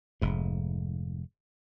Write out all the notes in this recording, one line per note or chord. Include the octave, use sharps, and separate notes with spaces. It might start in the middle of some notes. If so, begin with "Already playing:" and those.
F1 G#2